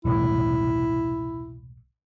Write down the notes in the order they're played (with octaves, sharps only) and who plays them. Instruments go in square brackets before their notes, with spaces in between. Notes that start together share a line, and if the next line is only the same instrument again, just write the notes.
[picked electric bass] E1 C2 A2 [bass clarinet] E4